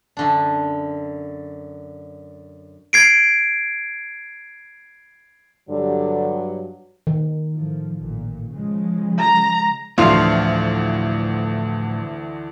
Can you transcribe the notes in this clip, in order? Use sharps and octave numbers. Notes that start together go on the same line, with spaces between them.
F#2 D3 D4
G#6 C7 D7
G2 D3 F#3
D#3
A2 F3
A1 A#2
C#3 F3 G#3
A#5
D2 A2 D3 E3 F3 F5